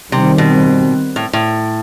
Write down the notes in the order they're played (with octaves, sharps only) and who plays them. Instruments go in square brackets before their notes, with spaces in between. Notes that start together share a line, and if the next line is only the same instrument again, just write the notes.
[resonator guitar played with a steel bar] C3 [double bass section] D#3 G3 C4
[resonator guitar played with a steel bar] B2
A2
A2